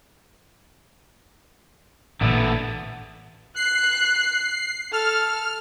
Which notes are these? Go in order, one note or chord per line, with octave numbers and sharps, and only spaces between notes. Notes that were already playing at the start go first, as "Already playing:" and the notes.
A1 A#2 D3 E3 A3 B3
F#6 C7
A4 F6